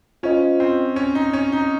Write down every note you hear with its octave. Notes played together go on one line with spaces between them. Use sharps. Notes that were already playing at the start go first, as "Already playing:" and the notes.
C#4 F4 C5 D#5
C4
C#4
D#4
C#4
D#4